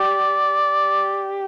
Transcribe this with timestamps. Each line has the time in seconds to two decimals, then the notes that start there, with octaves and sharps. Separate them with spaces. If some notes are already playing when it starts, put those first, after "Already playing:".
Already playing: G4 D5
0.64 G4